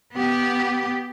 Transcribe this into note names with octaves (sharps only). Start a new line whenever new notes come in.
B3 G4